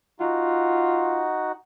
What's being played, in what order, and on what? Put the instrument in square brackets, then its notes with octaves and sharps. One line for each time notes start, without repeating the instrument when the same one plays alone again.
[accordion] D#4 F#4 F#5 [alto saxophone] F4